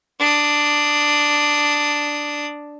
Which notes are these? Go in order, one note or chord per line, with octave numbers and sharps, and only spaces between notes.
D4 D#6